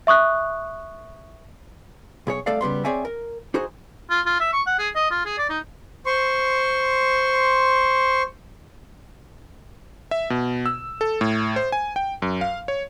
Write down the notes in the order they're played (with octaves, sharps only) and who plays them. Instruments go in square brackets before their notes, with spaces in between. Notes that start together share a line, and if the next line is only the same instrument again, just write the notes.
[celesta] E5 C#6 D#6 F#6
[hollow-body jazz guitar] B1 G#4 C#5
C2 A3 A4 D5 F5
C#3 G3 B3 C6
C4 G#4 C#5 D5 E5 G#5
A#4
D#4 F#4 G#4 C5
[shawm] F4
F4
E5
C#6
F#5
G#4
D#5
F4
G#4
D5
D#4
[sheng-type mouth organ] C5 C6 C#6
[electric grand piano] E5
B2
E6
A4
A2
C5
G#5
G5
F#2
F5
C#5